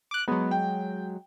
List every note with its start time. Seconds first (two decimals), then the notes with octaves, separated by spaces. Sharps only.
0.11 D6 F#6
0.28 F#3 G#3 B3
0.51 G5